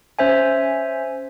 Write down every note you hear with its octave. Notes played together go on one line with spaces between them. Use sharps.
C#4 C5 E5 G#5